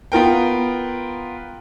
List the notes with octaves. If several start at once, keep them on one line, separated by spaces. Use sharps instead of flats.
B3 F4 A#4 G5